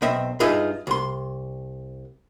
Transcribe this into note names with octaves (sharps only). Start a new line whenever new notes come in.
B1 C4 D#5 E5
G2 D#4 F4 G#4 D#5 E5
C2 C6